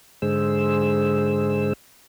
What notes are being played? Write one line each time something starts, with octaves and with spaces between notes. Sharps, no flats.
G#2 D3 G#3 G#4 C5 E6